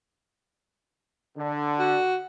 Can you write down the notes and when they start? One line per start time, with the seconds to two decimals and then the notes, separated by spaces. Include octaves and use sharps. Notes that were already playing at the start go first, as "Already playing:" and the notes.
1.38 D3
1.79 F#4